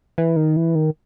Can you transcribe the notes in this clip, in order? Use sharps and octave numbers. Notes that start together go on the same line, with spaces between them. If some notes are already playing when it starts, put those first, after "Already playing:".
E3
D#3
E3
D#3